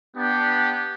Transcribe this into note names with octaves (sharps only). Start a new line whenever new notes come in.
B3 D4 G4